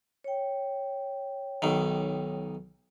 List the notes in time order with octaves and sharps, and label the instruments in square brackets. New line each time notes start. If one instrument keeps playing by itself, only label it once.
[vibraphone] C#5 G5
[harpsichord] B1 D#3